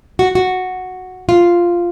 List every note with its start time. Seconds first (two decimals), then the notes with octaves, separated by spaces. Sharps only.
0.19 F#4
0.35 F#4
1.29 F4